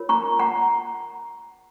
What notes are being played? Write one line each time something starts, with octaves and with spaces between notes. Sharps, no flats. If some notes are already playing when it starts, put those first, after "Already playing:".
Already playing: F4 A#4 C#5
A#5 C#6
F#5 A#5